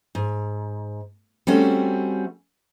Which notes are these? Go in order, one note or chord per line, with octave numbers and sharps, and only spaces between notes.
G#2
G3 A3 C4 C#4 F#4